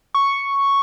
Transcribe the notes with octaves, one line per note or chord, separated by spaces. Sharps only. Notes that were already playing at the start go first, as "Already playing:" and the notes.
C#6